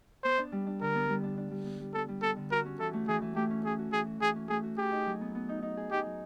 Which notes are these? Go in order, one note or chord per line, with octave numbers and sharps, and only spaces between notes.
B3 C5
D4
G3
D4
D3 A#4
B3
G3
D4
D4
G3
B3
G3
B3 A4
G3
B3 A4
D3
F#4 A#4
C#4
E3 A4
A3
E3 G#4
E3
A3 G4
C#4
C#4 G#4
F#4
E3 G#4
F#4
E3 G#4
C#4
A3 G#4
F#4
G4 G#4
D#4
F#3
B3
B3
D#4
D#4
G#4
D#4 G4
F#3